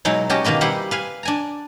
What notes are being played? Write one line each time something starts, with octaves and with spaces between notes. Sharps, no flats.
B2 F#3 G#3 D#4 E4
C#4 F#4 G4 D#5 A5
B2 D#3 A#3 B4 D#5
G3 E4 G4 B4 C5 F#5
B4 F5 G#5
D4 G#5 A#5